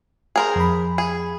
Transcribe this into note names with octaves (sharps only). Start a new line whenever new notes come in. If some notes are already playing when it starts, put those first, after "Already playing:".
G#4 A#4 C5
F2 B5
G#4